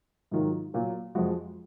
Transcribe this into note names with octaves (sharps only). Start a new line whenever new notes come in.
G#2 D#3 F#3 F4
A#2 F#3
F2 F3 G#3 F#4